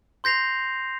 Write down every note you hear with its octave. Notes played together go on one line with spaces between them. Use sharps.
C6 G6 A#6 C7 F7